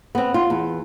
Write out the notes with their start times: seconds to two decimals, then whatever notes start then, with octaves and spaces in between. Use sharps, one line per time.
0.15 B3 C4
0.34 F4
0.50 E2